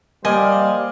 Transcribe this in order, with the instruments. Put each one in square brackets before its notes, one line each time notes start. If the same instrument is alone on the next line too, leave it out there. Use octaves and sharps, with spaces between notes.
[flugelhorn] G3 [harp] A#3 [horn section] C5 D5 F5 [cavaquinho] D#5 G#5